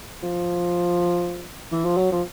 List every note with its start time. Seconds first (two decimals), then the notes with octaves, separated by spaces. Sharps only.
0.23 F3
1.72 E3
1.85 F3
1.97 F#3
2.12 F3